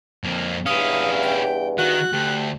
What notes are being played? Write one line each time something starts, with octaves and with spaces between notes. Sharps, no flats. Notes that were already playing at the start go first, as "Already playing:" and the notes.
F2 A#3
E2 G2 C#4 E4 F5 D#6
G5
D#3 F#4 F#6
D2 G4